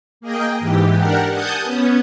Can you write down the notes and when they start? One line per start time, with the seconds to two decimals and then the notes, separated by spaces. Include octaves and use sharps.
0.21 A#3 G#4 D#5 G5
0.59 G#2 E3 G4
0.97 D4 G4 A#4 F#5
1.32 F#5 G#5 A5 D#6 G6
1.62 B3 C#4